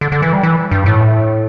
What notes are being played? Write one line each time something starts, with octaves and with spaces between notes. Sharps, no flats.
D3
D3
E3
G3
E3
G2
A2